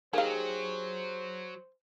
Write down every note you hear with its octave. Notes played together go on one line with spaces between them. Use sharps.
F#3 A#3 D#4 G4 G#4 C5 F5